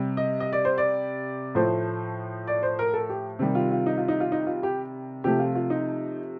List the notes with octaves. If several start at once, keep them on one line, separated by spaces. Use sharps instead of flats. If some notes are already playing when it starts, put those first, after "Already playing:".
Already playing: C3 G3
D#5
D#5
D5
C5
D5
A2 F3 A3 C5
D5
C5
A#4
A4
G4
C3 D#3 G3
F4
F4
D#4
F4
D#4
F4
D#4
F4
G4
C3 F3 A3 G4
F4
F4
D#4